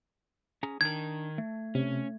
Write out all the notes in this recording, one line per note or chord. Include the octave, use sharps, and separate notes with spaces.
C#4 G#4 A#5
D#3 D4 A#4 G#6
A3
C3 C#4